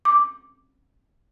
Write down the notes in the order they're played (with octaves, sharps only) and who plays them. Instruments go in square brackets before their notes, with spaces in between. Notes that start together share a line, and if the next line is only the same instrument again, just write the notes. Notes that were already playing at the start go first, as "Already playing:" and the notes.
[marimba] D6